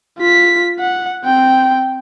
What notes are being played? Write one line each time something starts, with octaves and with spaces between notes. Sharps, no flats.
F4 B6
F#5
C4 G5